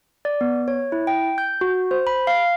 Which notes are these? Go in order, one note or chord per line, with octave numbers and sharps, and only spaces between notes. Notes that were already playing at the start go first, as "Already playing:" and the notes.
D5
B3
C#5
E4
G5
G6
F#4
C5
B5
F5